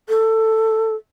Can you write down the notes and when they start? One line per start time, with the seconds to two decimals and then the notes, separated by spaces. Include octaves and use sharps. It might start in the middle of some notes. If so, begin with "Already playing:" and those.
0.09 A4